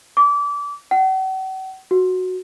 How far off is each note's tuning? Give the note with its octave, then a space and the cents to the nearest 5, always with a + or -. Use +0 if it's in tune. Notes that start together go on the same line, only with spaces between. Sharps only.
D6 -25
F#5 +45
F#4 -5